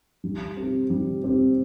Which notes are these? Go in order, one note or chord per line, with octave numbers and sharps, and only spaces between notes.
G3
C4 G4
G3
C4 G4